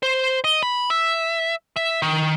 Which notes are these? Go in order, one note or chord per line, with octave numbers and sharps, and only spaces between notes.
C5
D#5
B5
E5
E5
D#3